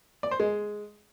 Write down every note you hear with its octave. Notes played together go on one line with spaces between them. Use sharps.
D5
C5
G#3